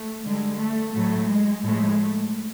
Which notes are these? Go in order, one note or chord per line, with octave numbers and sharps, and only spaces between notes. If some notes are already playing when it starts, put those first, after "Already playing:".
Already playing: A3
D3 G3 G#3
A3
A2 F#3 A3
G#3
A2 F3 G#3 A3